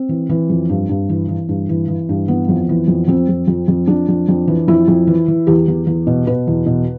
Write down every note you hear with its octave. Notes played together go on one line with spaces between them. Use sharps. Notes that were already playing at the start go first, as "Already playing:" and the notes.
Already playing: C4
E3
E3
F2
G2
G2
E3
E3
G2
E3
E3
G2
E3 B3
F2
E3
F2
F2 C4
F2
F2
F2
F2 D4
F2
F2
E3
F2 E4
F2
E3
E3
E2 G4
E2
E2
B2
B2 B4
E2
B2